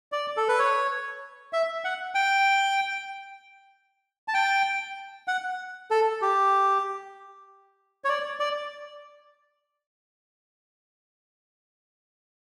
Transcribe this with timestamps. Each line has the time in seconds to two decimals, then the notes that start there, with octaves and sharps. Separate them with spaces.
0.12 D5
0.37 A4
0.48 B4
0.59 C#5
1.53 E5
1.84 F#5
2.15 G5
4.28 A5
4.34 G5
5.28 F#5
5.91 A4
6.22 G4
8.04 C#5
8.09 D5
8.40 D5